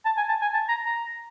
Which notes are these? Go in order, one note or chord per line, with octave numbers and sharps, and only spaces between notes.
A5
G#5
A5
G#5
A5
A#5
A#5